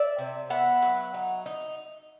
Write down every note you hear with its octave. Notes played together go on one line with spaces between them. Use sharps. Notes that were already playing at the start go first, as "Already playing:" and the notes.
Already playing: D5 E5
C3
B3 E5 F#5
F#3
D#4
D#4